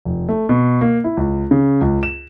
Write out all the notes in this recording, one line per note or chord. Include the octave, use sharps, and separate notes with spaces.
F1
A3
B2
A#3
E4
C#2
C#3
C#2
E7